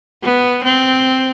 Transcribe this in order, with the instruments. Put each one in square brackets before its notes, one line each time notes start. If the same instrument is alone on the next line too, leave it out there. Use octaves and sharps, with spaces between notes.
[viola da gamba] B3
C4